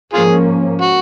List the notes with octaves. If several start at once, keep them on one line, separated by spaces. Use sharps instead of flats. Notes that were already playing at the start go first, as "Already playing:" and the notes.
G#2 F3 A#3 C#4 F4 G#4
F#4